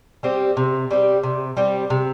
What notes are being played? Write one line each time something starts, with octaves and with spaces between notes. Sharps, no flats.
G3 C4 G4
C3
G3 C4 G4
C3
G3 C4 G4
C3